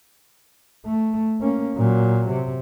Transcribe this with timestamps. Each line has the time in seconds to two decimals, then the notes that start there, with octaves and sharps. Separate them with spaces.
0.86 A3
1.41 A#3 C#4
1.76 A#2 F#3
2.30 C3